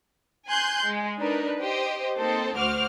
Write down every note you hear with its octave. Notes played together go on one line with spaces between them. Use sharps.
G#5 C6 F#6 G6
G#3
D4 D#4 A#4 B4
G4 C5 D#5
A#3 C4 D#4 A4 C5
D2 F#4 C5 D6 F6